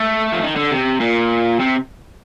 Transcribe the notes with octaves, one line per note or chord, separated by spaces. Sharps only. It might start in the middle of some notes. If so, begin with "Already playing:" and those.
Already playing: A3
F3
D#3
D3
C3
A#2
C3